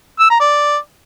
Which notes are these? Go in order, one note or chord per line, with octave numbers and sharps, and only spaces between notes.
E6
A#5
D5